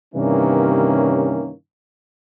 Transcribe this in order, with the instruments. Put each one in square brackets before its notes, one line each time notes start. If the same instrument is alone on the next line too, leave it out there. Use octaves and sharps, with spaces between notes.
[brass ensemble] G2 C3 D#3 E3 A#3 C#4